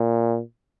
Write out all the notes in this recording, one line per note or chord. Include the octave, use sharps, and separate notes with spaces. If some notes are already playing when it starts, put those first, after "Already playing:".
Already playing: A#2